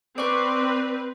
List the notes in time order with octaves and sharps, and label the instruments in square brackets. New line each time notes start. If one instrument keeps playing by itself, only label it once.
[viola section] C4 B4 [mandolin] D5 C#6